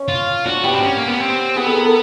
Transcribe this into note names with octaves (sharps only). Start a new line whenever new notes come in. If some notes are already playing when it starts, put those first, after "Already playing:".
Already playing: C#4
F4
D4 F#4
B3 G4
C4
C#4
A#3
B3
C4
B3 G#4
A4
A#4
A4